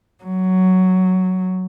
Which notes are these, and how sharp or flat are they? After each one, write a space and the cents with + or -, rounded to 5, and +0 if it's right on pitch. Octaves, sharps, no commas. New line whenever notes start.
F#3 +5